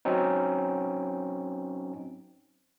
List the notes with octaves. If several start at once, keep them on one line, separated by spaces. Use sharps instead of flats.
F#3 C4 C#4 D#4